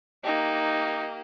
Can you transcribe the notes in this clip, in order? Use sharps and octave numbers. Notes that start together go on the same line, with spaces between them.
A#3 D#4 G4